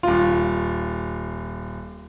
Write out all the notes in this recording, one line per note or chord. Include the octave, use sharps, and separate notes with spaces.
D#1 F4